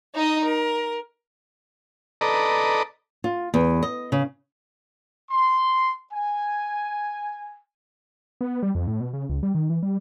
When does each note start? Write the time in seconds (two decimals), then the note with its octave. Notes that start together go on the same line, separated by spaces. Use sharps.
0.14 D#4 D#5
0.44 A#4
2.21 A4 B4 D5 D#5 A#5
3.24 F4
3.54 E2
3.83 D#5
4.12 C#3
5.30 C6
6.12 G#5
8.41 B3
8.63 G3
8.75 F2
8.87 A2
9.00 B2
9.13 C#3
9.29 C#2
9.43 G3
9.55 D#3
9.70 E3
9.83 G3